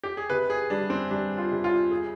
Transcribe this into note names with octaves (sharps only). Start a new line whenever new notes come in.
G4
G#4
C3 B4
G#4
G3 D4
C4
G3 D4
F4
C3
F4
G#4